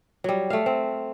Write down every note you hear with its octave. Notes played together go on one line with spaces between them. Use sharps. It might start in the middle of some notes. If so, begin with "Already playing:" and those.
F#3 G3
A3 F5
C4